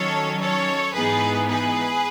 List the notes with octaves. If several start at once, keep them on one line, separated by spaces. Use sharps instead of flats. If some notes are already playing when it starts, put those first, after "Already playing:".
Already playing: D#3 F#3 C#4 A4 C#5
A4 C#5
G#2 E3 B3 D#4 G#4 B4
G#4 B4